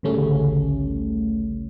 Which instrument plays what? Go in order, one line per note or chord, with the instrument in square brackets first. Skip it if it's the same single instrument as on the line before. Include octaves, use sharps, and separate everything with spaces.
[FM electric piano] A1 D2 C#3 G3 A3 C#4